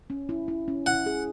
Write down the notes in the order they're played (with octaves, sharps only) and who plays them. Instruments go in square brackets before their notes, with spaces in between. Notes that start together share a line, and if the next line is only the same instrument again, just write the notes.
[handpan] C#4
E4
E4
C#4
[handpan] E4 [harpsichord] F#5
[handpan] G#4